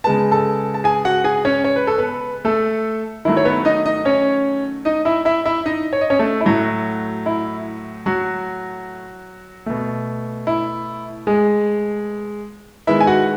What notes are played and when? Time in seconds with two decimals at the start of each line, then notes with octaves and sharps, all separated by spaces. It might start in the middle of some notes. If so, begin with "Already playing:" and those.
0.04 C#3 G#3 B3 A5
0.31 A4 A5
0.74 A5
0.84 G#4 G#5
1.05 F#4 F#5
1.24 G#4 G#5
1.45 C#4 C#5
1.64 C#5
1.76 B4
1.87 A4
1.98 B3 B4
2.45 A3 A4
3.25 D#3 F#3 A3 E4
3.37 C#5
3.45 B3 B4
3.65 D#4 D#5
3.86 D#4 D#5
4.05 C#4 C#5
4.85 D#4 D#5
5.05 E4 E5
5.25 E4 E5
5.46 E4 E5
5.66 D#4 D#5
5.93 C#5
6.01 D#5
6.10 C#4 C#5
6.19 A3 A4
6.41 E4
6.46 A2 F#3 A3 F#4
7.26 E4
8.06 F#3 F#4
9.66 B2 A3
10.47 E4
11.27 G#3 G#4
12.87 D#3 G#3 B3 E4 E5
13.00 G#5
13.07 F#4 F#5